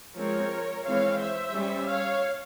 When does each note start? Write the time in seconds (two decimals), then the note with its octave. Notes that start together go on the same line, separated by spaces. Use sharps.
0.17 F3 G#3 C4 A#4 C#5
0.85 E3 G#3 C4 C#5 F5
1.20 C5 E5
1.54 G3 C#4
1.88 C#5 F5